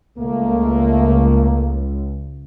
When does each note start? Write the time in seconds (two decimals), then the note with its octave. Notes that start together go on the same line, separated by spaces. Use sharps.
0.18 C#2 A3 A#3